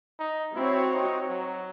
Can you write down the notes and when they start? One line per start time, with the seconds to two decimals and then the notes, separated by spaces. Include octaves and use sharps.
0.19 D#4
0.56 C4 E4 F#4 C#5
0.93 D#4
1.29 F#3